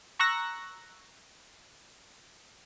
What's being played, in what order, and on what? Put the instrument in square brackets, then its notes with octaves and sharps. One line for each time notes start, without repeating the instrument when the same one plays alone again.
[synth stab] A#5 C#6 E6 F#6 A#6